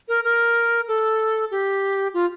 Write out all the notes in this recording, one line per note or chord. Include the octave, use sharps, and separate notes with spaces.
A#4
A#4
A4
G4
F4